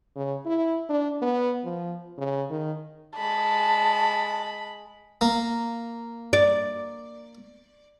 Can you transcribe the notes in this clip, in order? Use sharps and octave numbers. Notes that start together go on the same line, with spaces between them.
C#3
E4
D4
B3
F3
C#3
D#3
G#3 A5 B5
A#3
D5